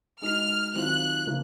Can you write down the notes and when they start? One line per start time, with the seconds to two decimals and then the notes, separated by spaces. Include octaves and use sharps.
0.21 G#3 D#4 F#4 F6
0.74 D#3 F#3 C4 F4 F#6
1.27 C#3 F3 A#3